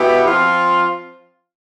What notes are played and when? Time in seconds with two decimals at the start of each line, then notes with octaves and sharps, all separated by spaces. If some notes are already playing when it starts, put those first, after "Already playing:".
Already playing: B2 B3 E4 G4
0.25 F3 C4 F4